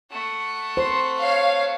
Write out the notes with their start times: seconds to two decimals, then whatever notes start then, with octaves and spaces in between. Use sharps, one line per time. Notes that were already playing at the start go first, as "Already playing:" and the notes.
0.11 A3 F#5
0.77 C5 C6
1.21 C#5 F5